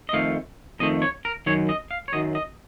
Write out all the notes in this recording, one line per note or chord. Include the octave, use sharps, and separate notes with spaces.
D#5
F2 D#3 A3 F5
F2 D#3 A3 D#5
C#5
A#4
F#2 D#3 F#3 C#5
D#5
F5
C#5
F#2 D#3 F#3 D#5
D#5